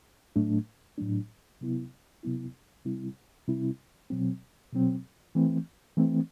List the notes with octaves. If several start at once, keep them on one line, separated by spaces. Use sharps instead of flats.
A2 F#3 A3 D4
A2 F#3 A3 D4
C3 F#3 B3 E4
C3 F#3 B3 E4
C3 G3 C4 E4
C3 G3 C4 E4
B2 F#3 C4
B2 F#3 C4
E3 A3 C4
E3 A3 C4